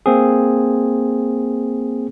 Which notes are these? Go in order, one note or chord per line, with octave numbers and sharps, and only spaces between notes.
A#3 C4 G#4